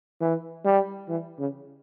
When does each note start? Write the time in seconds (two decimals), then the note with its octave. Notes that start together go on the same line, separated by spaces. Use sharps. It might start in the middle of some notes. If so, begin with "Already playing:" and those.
0.21 E3
0.65 G3
1.09 E3
1.39 C#3